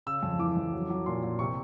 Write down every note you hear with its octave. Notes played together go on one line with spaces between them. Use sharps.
C#3 E6
F2
E3 D6
F2
F#3
F#3
A#2 C6
A#2
C3 C#6